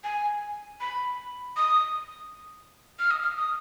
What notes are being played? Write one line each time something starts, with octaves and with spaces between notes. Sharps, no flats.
G#5
B5
D#6
F6
D#6
F6
D#6